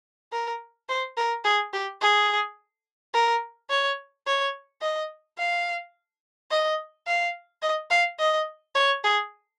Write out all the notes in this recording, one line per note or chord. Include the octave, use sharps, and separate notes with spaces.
A#4
C5
A#4
G#4
G4
G#4
A#4
C#5
C#5
D#5
F5
D#5
F5
D#5
F5
D#5
C#5
G#4